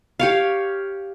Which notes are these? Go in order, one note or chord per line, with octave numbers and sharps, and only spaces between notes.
G4 C#5 F5